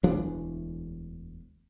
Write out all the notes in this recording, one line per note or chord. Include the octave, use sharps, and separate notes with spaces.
E1 D2 E3 D4